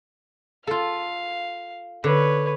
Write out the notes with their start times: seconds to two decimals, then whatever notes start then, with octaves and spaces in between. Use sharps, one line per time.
0.67 F4 A4 F5
2.04 D3 B4 C#5